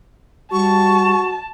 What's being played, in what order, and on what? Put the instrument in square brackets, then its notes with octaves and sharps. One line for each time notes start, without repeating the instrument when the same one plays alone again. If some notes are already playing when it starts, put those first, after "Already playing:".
[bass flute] G3 [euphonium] F#4 [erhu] A5 [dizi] C#6